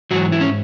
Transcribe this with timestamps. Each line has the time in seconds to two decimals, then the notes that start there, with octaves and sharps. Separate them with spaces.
0.11 G#2 E3 F#3 F#4
0.32 E4
0.41 C#4